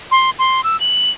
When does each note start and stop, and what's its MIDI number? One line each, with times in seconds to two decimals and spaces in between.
0.11 0.30 84
0.39 0.63 84
0.64 0.79 88
0.80 1.11 102